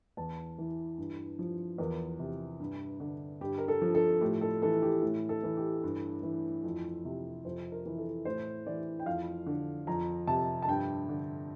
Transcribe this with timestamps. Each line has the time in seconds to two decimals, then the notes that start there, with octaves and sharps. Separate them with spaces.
0.17 E2 A5
0.58 E3
0.98 G2
1.39 F3
1.78 E2 A#4
2.19 C3
2.60 G2
3.00 D3
3.41 G2 G4
3.58 A#4
3.68 A4
3.82 F3
3.95 A4
4.21 A2 G4
4.41 A4
4.62 E3 A4
4.82 G4
5.02 A2
5.29 A4
5.43 E3
5.57 G4
5.84 G2
6.23 E3
6.64 F2
7.05 C3
7.45 F2 C5
7.72 A#4
7.85 E3
7.98 A4
8.25 A2 C5
8.66 E3 D5
9.00 G5
9.06 F2 F5
9.46 D3
9.87 F2 A#5
10.27 C3 A5
10.62 A5
10.68 G2 G5
11.09 D3